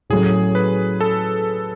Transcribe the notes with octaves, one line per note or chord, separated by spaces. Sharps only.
A2 F#3 C#4 G#4
B4
A4